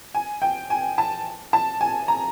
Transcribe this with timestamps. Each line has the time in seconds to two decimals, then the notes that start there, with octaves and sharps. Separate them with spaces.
0.14 G#5
0.42 G5
0.70 G#5
0.98 A5
1.53 A5
1.81 G#5
2.08 A#5